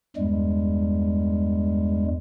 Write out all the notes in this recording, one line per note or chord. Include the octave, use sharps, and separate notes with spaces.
E2 G2 G3 G#3